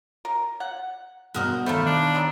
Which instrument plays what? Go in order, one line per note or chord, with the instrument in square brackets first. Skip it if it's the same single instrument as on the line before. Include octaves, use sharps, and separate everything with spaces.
[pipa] A#4
F#5
[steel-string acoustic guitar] G2 B2 C5 [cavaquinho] F#4 A#4 D#6
[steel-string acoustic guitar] D#3 E5 A5 [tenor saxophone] A3 [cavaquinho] F4 B5 [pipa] A4 C5
[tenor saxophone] D4
[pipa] G3 C4 D#4